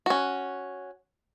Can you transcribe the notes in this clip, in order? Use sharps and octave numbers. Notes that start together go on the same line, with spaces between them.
C#4 F#4